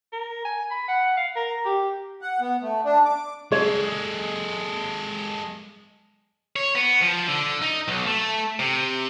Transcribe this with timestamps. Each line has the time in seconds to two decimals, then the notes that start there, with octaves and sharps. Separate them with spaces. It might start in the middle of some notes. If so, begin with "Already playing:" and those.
0.13 A#4
0.45 G#5
0.71 B5
0.88 F#5
1.17 F5
1.36 A#4
1.65 G4
2.22 F#5
2.41 B3
2.62 A3
2.85 D4
3.05 D6
3.52 G#3 G#4 A4 D5
6.56 C#5
6.75 B3
7.02 F3
7.27 D3
7.62 D#4
7.88 B1
8.07 A3
8.59 C3